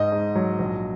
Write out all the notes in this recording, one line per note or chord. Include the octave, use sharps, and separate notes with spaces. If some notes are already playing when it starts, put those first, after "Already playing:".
Already playing: G#2 D#5
G#2
F#3
A#1